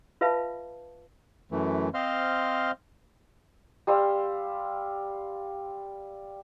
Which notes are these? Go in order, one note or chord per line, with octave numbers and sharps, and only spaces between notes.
F4 B4 E5 F5 A5 B5
F#2 E3 A3
C4 C5 D#5 F5 C6 F6
G3 F5 C6 E6